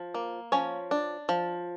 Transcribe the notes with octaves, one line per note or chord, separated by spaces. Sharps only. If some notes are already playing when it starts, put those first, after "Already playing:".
Already playing: F3
A#3
F3 C#4 C#5
D4
F3